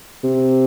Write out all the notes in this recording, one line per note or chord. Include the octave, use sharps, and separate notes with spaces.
C3